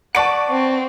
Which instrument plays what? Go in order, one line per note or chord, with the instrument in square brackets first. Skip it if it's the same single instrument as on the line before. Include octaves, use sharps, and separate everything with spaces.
[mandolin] B4 D5 [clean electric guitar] F#5 A5 [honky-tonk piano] C#6 D7
[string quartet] C4